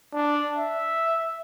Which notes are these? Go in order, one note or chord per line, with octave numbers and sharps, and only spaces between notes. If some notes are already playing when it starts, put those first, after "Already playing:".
D4
E5